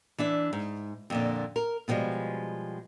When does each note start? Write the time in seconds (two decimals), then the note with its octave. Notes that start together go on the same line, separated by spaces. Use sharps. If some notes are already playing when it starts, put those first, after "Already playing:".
0.18 E3 D4 E5
0.53 G#2
1.10 F2 A#2 D3
1.56 A#4
1.88 B2 D3 F3 G3 G#3